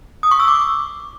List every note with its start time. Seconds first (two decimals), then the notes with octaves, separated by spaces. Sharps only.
0.23 D#6
0.31 C#6
0.40 E6
0.48 D6